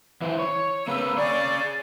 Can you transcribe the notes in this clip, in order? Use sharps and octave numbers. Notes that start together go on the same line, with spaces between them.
E3 E4 C5
C#5
C#3 A#3 C4 B4 E6
G#4 C#5 D5